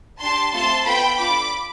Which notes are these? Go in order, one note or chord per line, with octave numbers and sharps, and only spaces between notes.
D4 G4 A5 C6
A3 C4 F4 A4 A5 C6
B3 F4 A4 G5 B5
D4 F4 A4 B5 D6